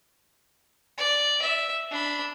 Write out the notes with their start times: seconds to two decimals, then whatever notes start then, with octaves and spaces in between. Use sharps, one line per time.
0.98 D5
1.42 E5
1.91 D4 B5